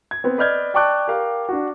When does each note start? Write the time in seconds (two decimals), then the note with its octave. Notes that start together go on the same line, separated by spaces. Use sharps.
0.11 G#6
0.24 B3 C4
0.38 B4 D5 D#5 F6 G6 G#6
0.74 D5 G5 A5 C#6 D6 F#6
1.07 G4 A#4 F5
1.49 D4 F#4